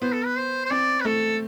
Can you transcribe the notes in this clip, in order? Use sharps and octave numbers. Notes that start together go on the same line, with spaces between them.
B3 C5
A4
B4
C5
C5
C4 D5
B4
A3 A4